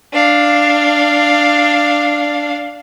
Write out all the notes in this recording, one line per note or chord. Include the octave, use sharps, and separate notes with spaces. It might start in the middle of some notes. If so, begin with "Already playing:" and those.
D4 F5